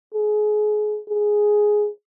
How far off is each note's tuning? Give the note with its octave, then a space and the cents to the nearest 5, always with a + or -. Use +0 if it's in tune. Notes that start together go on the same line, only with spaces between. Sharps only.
G#4 +30
G#4 +5